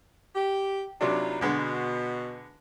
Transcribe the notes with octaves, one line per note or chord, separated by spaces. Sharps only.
G4
C3 F#3 D4 D#4 F4 B4
B2 D3 G#3 B3